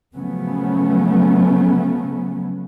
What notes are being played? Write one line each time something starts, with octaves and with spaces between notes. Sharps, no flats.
C#3 F3 F#3 A3 B3 C#4